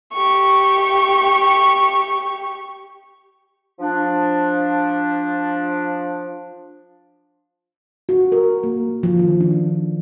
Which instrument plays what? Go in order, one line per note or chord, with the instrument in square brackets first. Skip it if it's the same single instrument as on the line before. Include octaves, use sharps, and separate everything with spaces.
[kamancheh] G4 C#6
[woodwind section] F3 D4
[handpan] F#4
A#4
A#3
F3
D#3
D4